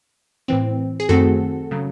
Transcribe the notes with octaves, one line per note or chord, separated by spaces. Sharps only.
A2 E3 C4
G#4
F#2 D#3 A3 C4 F#4 A4
C#3 F#3